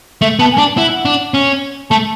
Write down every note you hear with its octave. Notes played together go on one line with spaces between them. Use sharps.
A3 E5
B3 A5
G#5
D4 A5
E4 F#5
D4
C#4
A3 A5